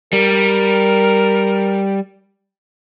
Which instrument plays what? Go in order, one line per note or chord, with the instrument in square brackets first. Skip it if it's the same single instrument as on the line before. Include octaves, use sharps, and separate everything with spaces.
[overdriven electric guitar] G3 [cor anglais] A#4